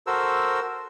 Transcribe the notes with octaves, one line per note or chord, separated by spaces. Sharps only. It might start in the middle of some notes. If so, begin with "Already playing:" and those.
F#4 A4 A#4 C5 E6